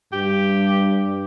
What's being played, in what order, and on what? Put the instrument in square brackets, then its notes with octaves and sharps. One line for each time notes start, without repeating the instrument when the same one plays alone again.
[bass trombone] G2 [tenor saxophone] G4